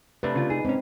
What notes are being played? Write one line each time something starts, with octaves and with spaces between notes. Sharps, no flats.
C3 A3 D4 B4
C#3 F4
D#4 G#4
G#2 C4 C#4